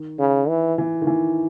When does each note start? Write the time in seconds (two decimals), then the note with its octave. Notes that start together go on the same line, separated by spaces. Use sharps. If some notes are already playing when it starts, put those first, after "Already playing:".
Already playing: D#3
0.19 C#3
0.49 E3
0.78 E3
1.01 D#3
1.07 E3